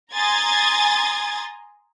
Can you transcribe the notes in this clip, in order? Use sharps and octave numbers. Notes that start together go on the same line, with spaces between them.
G#5 A#5 C6 D#6 G#6 A6